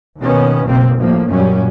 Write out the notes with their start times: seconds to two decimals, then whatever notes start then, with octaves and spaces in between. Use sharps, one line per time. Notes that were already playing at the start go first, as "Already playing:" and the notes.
0.18 D#2 B2 D#3 B3 C#4
0.63 F#1 B1 B2 A#3 C4
0.97 G1 D2 A2 F3 A#3
1.28 F#2 A#2 F#3 G3 C#4